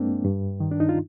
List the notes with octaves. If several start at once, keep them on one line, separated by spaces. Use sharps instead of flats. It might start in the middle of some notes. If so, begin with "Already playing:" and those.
Already playing: G2 G#3 A#3 C4 D4
G2
D#3
D4
D#4
F4